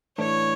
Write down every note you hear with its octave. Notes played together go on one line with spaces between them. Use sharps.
A2 E3 A3 D4 C#5